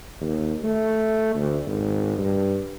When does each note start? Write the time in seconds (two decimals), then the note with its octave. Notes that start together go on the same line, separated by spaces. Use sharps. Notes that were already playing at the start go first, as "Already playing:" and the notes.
0.21 D#2
0.64 A3
1.35 D2
1.66 G#1
2.18 G2